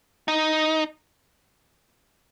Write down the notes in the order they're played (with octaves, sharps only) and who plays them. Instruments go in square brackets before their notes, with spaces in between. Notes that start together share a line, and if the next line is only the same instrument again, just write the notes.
[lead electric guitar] D#4